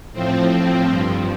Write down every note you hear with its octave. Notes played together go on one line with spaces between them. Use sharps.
A2 F3 C4
G2 F3